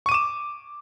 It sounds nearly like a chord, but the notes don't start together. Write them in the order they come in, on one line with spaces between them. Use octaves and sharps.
C#6 D#7 D6 E7